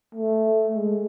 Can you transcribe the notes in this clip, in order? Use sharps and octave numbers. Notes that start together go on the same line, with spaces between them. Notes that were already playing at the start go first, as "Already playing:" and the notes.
A3
G#3